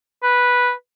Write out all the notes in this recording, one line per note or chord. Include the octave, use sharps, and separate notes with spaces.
B4